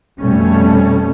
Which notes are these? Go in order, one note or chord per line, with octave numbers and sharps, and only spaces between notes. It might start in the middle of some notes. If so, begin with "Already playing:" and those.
F2 B2 G3 A3 C#4